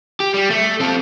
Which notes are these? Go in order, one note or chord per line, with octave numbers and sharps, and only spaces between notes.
G4
G3
A3
C4 A4